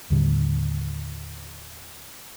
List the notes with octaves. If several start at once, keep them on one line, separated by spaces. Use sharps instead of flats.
D#2 A2 D3 G3